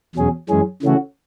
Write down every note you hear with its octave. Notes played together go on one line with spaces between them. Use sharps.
E2 B2 F#3 C#4 G#4
F#2 E3 G#3 C#4 G#4
C#3 E3 A3 C#4 F#4